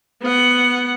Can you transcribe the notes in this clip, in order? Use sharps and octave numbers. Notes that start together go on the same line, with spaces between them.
B3 F#5